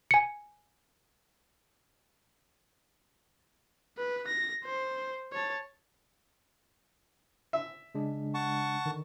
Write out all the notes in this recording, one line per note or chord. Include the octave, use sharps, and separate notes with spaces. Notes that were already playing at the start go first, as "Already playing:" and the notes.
G#5 C#7
B4
A#6
C5
C#5 A5
E5
C#3 G#3 D4
F#5 A5 C#6
D3 D#3